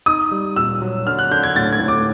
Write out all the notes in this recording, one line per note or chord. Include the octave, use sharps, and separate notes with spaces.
D#4 D#6
G3
A#2 E6
F#3
D3 F6
F#6
D3 G6
G#6
A2 A6
G#6
A2
D6